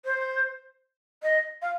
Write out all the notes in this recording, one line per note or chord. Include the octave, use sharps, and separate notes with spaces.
C5
D#5
F5